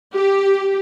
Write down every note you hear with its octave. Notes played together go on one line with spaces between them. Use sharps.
G4